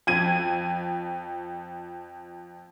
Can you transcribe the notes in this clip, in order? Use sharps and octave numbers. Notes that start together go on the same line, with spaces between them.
F2 G#6 D#7